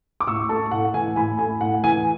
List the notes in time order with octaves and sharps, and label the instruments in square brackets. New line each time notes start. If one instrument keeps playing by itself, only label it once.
[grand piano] D6
A2 C#6 E6
A3 A5 C#6
A2 F#5
E3 G#5
A2 G#5 B5
A3 G#5
A2 F#5
E3 G#5